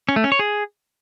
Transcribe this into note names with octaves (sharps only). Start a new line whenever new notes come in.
C#4
A3
C#4
C#5
G#4